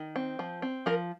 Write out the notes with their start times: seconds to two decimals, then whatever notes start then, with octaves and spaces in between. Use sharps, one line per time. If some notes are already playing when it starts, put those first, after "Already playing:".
Already playing: D#3
0.16 C4
0.39 F3
0.62 C4
0.86 F3 A#4